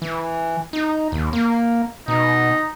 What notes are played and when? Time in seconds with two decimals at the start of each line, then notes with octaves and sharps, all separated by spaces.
0.02 E3
0.73 D#4
1.12 D#2
1.33 A#3
2.08 B2 D#4